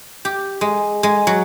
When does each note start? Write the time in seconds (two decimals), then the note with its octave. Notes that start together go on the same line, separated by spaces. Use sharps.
0.25 G4
0.61 G#3
1.03 G#3
1.27 F#3